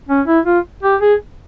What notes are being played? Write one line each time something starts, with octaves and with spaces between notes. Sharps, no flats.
C#4
E4
F4
G4
G#4